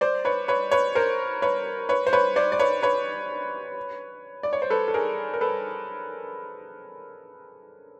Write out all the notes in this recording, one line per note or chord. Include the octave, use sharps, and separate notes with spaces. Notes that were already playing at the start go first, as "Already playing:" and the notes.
C5 D5
B4 C#5
B4 C#5
B4 C#5
A#4 C5
B4 C#5
B4 C#5
C5
B4 C#5
C5 D5
D5
B4 C#5
B4 C#5
D5
C#5
C5
A4 B4
A4
G#4 A#4
A#4
A4 B4